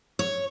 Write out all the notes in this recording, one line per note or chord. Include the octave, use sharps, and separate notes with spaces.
C#5